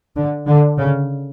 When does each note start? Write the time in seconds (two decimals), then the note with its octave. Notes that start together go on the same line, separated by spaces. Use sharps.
0.16 D3
0.47 D3
0.78 C#3